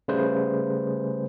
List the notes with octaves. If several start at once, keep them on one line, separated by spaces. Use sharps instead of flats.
C#3 G3 A3 G#4 B4 C5